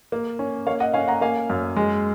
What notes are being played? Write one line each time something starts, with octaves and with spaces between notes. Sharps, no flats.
A#3
C#4
A#3 C#5 F5
D#5 F#5
C#4 F5 G#5
F#5 A#5
A#3 F5 G#5
F#2
G#3